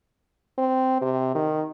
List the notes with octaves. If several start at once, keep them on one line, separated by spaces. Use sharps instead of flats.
C4
C3
D#3